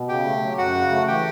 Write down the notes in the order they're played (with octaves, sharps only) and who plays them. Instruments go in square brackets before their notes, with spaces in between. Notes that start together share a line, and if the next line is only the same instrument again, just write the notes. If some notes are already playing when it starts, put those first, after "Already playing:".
Already playing: [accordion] B2
[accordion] C#3 [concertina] G4 G5
[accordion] A3
F#3
[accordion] F#2 [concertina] F#4 F#5
[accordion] C#3
A3
[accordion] E3 [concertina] G4 G5